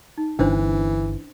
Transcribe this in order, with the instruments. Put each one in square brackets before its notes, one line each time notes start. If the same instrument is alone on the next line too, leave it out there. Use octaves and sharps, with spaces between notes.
[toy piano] D#4
[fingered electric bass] G1 [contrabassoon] E3 [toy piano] C#4 D4 C5